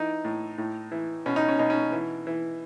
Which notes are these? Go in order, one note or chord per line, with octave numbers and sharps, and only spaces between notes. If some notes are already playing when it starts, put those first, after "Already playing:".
Already playing: E3 D#4
A2
A2
E3
B2 C#4
D#4
C#4
B2 D#4
C#4
E3
E3